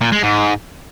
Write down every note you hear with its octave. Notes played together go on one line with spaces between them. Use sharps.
A#2
G#3
G#2